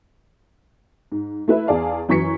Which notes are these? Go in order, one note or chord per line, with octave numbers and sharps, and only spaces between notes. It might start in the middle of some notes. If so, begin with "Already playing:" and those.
G#2
A3 E4 B4 E5
E2 G#4 D5 F5 A5
F#2 E3 C#6 B6 C#7